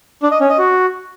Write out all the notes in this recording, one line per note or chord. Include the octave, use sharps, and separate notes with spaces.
D4
D#5
C#4
D#5
F#4